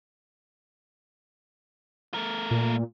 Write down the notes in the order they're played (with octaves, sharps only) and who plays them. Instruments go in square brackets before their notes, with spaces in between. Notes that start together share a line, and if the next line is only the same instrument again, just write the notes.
[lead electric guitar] A3 A#4
[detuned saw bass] A#2